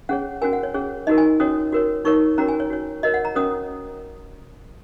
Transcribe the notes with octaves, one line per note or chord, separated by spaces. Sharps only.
C#4 G#4 C#5 F#5
C#4 F#4 A#4 G#5
F#5
C#5
C#4 G#4 C#5
D#4 F#4 A#4 D#5
G#5
C#4 F#4 C#5 D#6
F#4 A#4 C#5
D#4 A#4 C#5 C#6
C#4 F#4 A#4 C#5 A#5
G#5
C#5
F#4 C#5
F#4 A#4 C#5 D#5
F#5
A#5
C#4 F#4 A#4 C#5 D#6